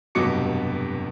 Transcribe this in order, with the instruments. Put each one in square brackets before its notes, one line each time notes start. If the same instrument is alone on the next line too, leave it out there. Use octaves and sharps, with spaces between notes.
[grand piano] F1 G2 B2 F#3 D6 C#7